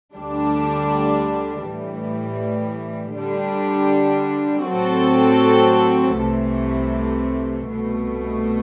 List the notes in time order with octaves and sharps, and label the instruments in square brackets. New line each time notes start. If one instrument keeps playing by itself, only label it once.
[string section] D2 D3 G3 D4
A2 E3 G3
D3 G3 D4
A2 F#3 C4 F#4 A4
C2 C3 E3 A3
C2 B2 A3